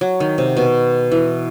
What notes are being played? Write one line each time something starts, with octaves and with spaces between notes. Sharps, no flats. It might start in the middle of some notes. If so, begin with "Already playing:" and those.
F#3
D#3
C3
B2
E3